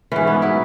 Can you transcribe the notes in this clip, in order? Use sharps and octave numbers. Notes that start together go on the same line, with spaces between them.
G#2 E3 C#4
B3
F#3 E4